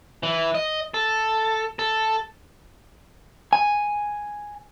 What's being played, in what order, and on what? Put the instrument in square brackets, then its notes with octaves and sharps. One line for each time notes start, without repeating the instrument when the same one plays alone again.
[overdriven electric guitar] E3
D#5
A4
A4
[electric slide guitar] G#5